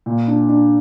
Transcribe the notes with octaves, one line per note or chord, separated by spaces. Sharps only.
A#2
D4
D4